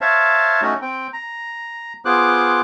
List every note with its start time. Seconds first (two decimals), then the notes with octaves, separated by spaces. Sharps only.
0.01 C5 C#5 E5 F5 A5
0.62 A3 C#4 D#4 F#4
0.82 C4 G5
1.13 A#5
2.05 B3 F4 G#4 C5 D6 F#6